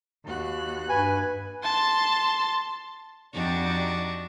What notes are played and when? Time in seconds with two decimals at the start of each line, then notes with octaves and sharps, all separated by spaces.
0.25 D#2 F#4 F#6
0.90 G2 B4 G#5
1.64 A5 C6
3.33 F2 D4 D#4 F#4 G4 D5